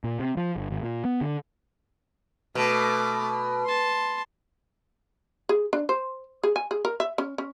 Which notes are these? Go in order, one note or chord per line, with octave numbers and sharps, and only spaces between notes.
A#2
C3
F3
G1
G#1
A#2
B3
D3
B2 A3 D6
A5 C6
G#4
D4
C5
G#4
G#5
G#4
A#4
E5
C#4
C#4